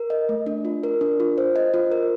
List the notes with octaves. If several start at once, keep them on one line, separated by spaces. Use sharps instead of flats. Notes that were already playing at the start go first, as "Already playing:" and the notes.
Already playing: A#4
D#5
A3
D4
F4
A#4
D4
F4
C5
D#5
F4
A#4